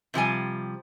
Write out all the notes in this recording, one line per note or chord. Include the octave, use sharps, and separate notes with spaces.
C3 F3 G3 G#5